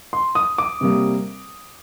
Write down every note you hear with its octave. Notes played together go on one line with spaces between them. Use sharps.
C6
D#6
D6
C3 G3 A#3